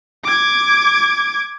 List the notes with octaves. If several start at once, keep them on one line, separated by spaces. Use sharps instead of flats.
D6 G#6